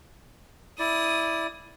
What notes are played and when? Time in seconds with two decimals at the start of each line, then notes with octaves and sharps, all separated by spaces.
0.79 E4 D5 D#6